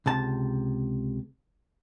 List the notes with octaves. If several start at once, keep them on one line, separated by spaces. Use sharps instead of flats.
C#2 C3 A5